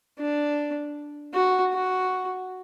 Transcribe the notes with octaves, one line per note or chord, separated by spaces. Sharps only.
D4
F#4
F#4